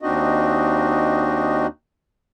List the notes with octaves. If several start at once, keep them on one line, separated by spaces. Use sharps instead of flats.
D#2 C4 D4 D#4 F#4 D#5